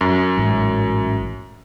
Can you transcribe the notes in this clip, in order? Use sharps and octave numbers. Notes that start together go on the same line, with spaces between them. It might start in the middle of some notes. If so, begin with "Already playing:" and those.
F#2
A1 G#2